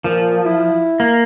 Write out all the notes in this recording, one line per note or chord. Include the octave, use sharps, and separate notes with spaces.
A#2 F3
E4
A#3